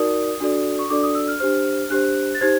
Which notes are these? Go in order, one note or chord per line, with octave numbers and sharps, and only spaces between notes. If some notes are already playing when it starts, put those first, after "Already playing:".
Already playing: D#4 F#4 A#4 D5 D#6
D4 F#4 A4 D5
C#6
D4 F#4 A4 D5 D6
D#6
E6
F6
D4 G4 C5 F6
D4 G4 C5 F#6
A6
D#4 G4 C5 G#6